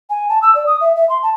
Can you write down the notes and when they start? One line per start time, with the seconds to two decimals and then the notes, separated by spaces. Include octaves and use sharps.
0.10 G#5
0.29 A5
0.42 E6
0.55 D5
0.67 D#6
0.81 E5
0.96 E5
1.09 C6
1.23 A5